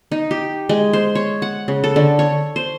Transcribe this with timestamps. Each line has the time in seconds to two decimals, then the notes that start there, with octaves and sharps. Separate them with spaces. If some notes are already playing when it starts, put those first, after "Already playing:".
0.12 D#4
0.31 G4
0.69 G#3
0.93 C5
1.15 C#5
1.42 F#5
1.68 C#3
1.84 A4
1.96 D3
2.19 C#5
2.56 C5